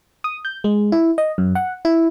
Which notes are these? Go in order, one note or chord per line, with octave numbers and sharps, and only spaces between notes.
D#6
G6
G#3
E4
D#5
F#2
F#5
E4